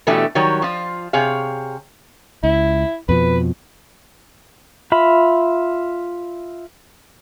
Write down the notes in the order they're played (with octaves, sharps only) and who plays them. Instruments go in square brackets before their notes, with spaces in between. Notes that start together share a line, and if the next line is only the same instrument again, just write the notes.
[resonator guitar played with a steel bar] B2 E3 A3 D4 G4 A4
D#3 F#3 G3 C#5
F3 F4
C3 G#4 C#5 F5
[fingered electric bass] C#2 [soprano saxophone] E4
[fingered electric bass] F2 B2 F3 [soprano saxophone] B4
[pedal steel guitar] F4 E5 B5